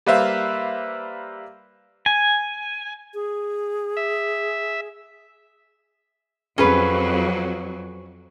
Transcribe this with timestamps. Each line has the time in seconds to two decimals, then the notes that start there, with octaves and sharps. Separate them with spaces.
0.06 G3 A#3 B4 C5 E5 F5
2.06 G#5
3.14 G#4
3.97 E5
6.58 F2 F#3 C#4 G#4 B4